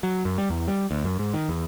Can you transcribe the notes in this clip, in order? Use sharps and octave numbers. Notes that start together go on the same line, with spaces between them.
F#3
F#2
G3
E2
G3
D2
F#2
G#2
D#3
E2